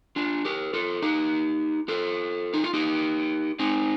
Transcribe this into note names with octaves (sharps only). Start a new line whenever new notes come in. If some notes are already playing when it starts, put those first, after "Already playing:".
D4 F4
G4 A#4
F4 A4
D#4 G4
F4 A4
D#4
F4
D#4 G4
C4 D#4